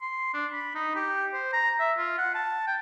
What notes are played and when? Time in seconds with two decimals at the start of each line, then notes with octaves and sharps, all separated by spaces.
0.02 C6
0.34 D4
0.53 B5
0.75 D#4
0.95 G4
1.34 C5
1.53 A#5
1.80 E5
1.98 F4
2.18 F#5
2.34 A5
2.67 G5